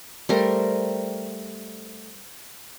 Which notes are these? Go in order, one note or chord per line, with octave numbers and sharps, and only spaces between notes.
G3 A3 A#4 C5